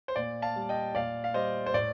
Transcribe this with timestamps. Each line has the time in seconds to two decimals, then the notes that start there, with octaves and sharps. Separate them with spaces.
0.08 C5
0.16 A#2 D5
0.42 F5 A5
0.56 G3
0.69 D#5 G5
0.95 A#2 D5 F5
1.24 F5
1.34 G3 C5 D#5
1.66 C5
1.74 A2 D5